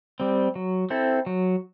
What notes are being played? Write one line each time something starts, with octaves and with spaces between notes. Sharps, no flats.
G3 C4
F#3
C4 E4 A4
F#3